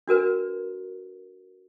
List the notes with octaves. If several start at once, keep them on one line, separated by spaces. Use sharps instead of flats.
D4 F#4 A#4 B4